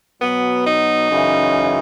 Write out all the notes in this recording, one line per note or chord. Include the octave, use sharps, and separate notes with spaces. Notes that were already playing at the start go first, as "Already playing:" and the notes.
B2 F#3 B3
D#4
F#2 C#3 E3